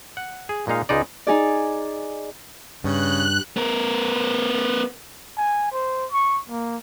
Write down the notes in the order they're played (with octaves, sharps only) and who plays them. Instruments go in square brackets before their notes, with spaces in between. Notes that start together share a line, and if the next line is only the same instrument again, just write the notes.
[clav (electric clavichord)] F#5
G#4
A#2 G#3 D#4 F5
C#2 G#3 D#4 D5
[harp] D#4 G#4 D5
[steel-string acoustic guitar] G2 [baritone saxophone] C#3 [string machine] F#6
[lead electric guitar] B3 A#4
[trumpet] G#5
C5
C#6
A#3